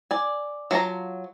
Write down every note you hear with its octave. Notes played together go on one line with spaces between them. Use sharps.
D5 G#5
F#3 F4 A5 A#5